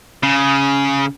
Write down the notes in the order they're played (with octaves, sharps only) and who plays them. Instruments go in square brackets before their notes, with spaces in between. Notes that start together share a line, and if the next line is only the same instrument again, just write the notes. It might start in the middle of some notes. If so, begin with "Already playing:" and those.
[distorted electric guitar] C#3